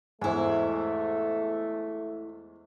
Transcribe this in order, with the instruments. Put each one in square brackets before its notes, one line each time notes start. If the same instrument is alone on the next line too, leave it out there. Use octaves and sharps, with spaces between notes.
[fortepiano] E2 G#2 [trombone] A3 [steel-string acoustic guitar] E4 C#5 [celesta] C5 G#5